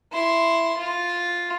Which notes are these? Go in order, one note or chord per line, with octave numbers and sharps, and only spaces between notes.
E4 C6
F4